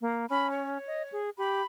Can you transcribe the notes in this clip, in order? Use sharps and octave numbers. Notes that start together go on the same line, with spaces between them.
A#3
C#4 B5
C#5
D#5
G#4
G4 B5